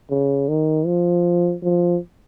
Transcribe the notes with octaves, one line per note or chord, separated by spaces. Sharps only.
C#3
D#3
F3
F3